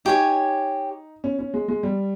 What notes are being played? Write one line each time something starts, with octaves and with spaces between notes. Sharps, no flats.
D#4 G4 C#5 G#5
C#4
C#4
G#3
G#3
G3